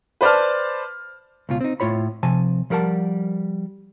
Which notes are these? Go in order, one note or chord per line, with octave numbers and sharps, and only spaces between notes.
B4 C5 D5 A5 F6
C#2 B2 F4
C4 D#4
A2 F4 C#5 B5
C3 F3 G#5 A5
F3 G3 A#4 F#5 A5